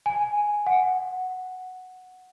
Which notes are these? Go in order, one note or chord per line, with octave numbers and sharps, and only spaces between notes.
G#5
F#5